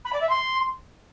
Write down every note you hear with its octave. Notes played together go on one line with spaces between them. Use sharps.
B5
D5
E5
C6